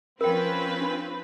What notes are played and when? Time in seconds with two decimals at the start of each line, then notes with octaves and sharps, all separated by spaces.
0.21 F3 C4 C#4 F4 A#4 B4 G5
0.81 D4